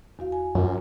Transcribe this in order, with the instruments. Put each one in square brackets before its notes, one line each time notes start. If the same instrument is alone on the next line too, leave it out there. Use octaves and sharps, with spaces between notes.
[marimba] E2 F#4 F5
G#5
[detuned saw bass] F#2 [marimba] F4